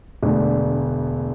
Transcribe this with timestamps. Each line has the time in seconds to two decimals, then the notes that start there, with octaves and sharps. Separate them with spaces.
0.23 E1 D2 D3